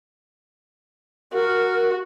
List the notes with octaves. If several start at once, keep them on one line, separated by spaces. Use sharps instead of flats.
F#4 A#4